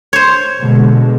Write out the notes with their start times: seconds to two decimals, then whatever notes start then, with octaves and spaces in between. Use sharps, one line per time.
0.13 C5 C#5
0.60 B2 D3 G#3